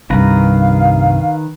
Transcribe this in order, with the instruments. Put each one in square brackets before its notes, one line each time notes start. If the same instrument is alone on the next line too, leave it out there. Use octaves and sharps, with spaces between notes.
[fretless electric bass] C2 G2 [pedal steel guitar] D#3 B4 A#5 [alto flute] F5